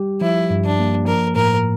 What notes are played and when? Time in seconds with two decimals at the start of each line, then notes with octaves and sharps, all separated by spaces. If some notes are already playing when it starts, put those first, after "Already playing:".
Already playing: G3 G4
0.21 F3 E4
0.50 G2
0.65 D4
0.79 A#3
1.07 F3 A#4
1.36 A2 A#4